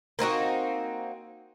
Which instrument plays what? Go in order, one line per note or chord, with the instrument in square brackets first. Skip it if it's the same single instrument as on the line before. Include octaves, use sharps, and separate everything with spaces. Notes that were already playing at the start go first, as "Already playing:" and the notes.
[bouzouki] A#3 C4 D#4 F#4